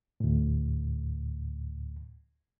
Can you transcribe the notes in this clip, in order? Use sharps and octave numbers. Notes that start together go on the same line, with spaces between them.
D2 A2